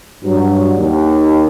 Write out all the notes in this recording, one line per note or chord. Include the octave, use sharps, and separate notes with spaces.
G2 F#3
D#2